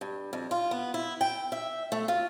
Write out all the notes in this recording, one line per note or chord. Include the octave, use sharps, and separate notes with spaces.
G2
F2
F4
B3
E4
G5
E5
A3
F4